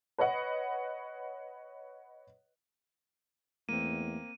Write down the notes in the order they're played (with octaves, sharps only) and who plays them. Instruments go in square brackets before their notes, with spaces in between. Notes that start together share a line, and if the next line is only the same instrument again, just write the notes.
[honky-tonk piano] B4 C#5 D#5 F#5
[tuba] E2 [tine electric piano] A3 [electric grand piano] A#3 C4 [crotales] D#7